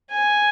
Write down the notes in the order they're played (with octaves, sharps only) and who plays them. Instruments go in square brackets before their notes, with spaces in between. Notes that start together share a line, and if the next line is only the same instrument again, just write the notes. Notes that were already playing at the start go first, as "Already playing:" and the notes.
[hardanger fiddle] G#5